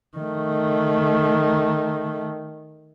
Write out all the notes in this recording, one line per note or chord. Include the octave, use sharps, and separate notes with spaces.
D#3 A3